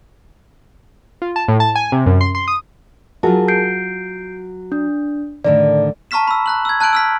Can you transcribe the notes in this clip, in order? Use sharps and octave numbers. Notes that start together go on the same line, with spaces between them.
F4
A5
A2
A5
G#5
C3
F#2
C6
C6
D#6
F#3 F4 F#4 G#4 A#4 A5
G6 C7 D7
D4
A2 D3 D#3 D5
A5 A#5 C#6 F6 B6 E7
B5 E6
A#5 F#6 F#7
E6 G#6
A5 F#6 G6 D7 F#7
E6 F6 B6